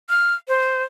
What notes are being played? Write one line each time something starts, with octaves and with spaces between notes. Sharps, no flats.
F6
C5